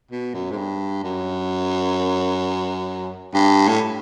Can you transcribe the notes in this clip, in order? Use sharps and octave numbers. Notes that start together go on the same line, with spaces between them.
B2
F#2
G#2
G2
F#2
G2
A2